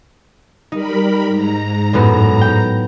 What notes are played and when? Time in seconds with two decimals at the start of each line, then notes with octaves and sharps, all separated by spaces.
0.72 G3 D#4 A#4 B5
1.28 G#2 A#5
1.93 F#2 A2 B3
2.41 G5